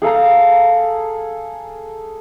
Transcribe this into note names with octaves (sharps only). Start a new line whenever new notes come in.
G#4 A4 F5 A#5